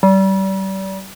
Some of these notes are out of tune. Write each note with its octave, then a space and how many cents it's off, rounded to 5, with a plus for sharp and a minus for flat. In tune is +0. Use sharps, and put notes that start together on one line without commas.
G3 -30